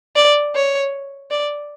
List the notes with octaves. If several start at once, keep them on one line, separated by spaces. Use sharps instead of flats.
D5
C#5
D5